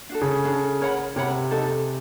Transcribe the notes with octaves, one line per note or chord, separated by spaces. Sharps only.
D4 F#4 A4
C#3
D4 F#4 A4
A#4 C#5 F#5 B5
C3 A#4 C#5 F#5 B5
D#4 F#4 A4